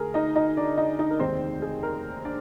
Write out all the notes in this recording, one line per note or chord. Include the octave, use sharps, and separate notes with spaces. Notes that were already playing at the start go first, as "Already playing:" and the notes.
Already playing: D2 G#4 A#4
D#4 D#5
D#4 D#5
D4 D5
D#4 D#5
D#4 D#5
A#4
F1 D#2 D#3 G#3 C4 C5
G#4
A#4
D4 D5